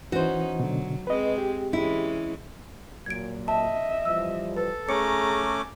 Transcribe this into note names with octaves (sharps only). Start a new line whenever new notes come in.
E3 C#4 D#4 F#4 C5
B2 D3 F#3
G#3 C4 B4 D#5
G4
E3 G#3 C#4 E4
A#2 F#3 G#6 D7
D#5 E5 A5
E3 F3 G3 E6
A4 B4
A3 C#4 G#4 C#5 A#5 D6 C#7